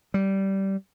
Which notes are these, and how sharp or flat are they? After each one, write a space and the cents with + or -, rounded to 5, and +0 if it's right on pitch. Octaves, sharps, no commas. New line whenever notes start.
G3 -15